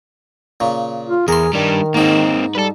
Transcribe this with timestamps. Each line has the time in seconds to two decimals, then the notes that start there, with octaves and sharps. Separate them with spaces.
0.60 A#2 C#3
1.09 F4
1.28 E2 G#4 A#4 C6
1.53 D#3 G3 D4
1.94 G#2 A#3 C4 D#4
2.55 G3 A4 B4